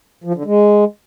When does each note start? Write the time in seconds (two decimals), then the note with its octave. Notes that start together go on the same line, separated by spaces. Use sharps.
0.24 F3
0.35 D3
0.45 G#3